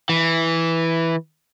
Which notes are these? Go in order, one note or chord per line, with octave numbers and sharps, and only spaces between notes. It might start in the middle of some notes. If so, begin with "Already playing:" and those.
E3